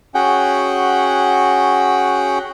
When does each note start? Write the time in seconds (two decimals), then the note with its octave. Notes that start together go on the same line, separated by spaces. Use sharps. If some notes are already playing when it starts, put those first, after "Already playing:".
0.14 C#4 F#4 G#4 F#5 G5